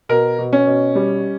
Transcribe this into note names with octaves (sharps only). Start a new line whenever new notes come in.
B2 A#4
B2
C#4
B2
G3